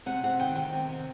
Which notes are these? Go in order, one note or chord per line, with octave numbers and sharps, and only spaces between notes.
C3 F#5
C3 F#5
D#3 G5
D#3 G5
C3
C3